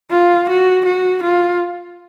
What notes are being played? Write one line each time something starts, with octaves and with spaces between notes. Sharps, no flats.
F4
F#4
F#4
F4